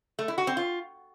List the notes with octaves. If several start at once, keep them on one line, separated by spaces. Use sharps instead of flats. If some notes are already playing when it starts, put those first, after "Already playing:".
A3
E4
F#4
C4
F4